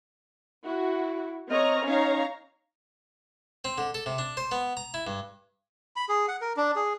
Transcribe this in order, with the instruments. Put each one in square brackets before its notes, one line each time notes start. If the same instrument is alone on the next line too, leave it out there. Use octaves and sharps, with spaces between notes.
[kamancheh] E4 [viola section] F#4
[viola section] C4 C#5 A#5 [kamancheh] D#5 F6
[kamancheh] C#4 D#4 [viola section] C#5 F5 A#5
[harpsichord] C4
D3
A4
C3
D4
C5
B3
A#5
E4
G2
[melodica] B5
G#4
F#5
A#4
D4
G#4